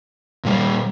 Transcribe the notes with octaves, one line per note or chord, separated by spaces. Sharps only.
A#2 G3 A#3